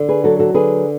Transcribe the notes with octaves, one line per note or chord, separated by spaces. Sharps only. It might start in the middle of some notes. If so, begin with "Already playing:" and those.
Already playing: D3
G#4 B4
F#3 F#4 A4
F#4 A4
D3 G#4 B4